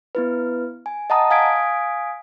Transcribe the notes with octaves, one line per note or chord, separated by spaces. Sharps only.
B3 E4 B4
G#5
D#5 F#5 A5 A#5 D#6
F5 G#5 D#6 G#6 B6 D7